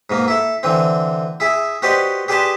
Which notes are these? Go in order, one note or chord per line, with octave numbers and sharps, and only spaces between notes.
G#2 B2 A#3
E4 A4
D3 E3 C4
E4 G#4 E5
F#4 G4 B4 C5 D5 D#5
G4 G#4 B4 D5 A5 C6